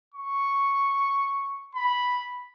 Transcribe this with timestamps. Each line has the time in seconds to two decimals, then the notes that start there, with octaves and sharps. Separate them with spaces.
0.15 C#6
1.76 B5